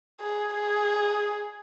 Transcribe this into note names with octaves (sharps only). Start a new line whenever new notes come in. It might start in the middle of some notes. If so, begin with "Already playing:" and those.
G#4
G#4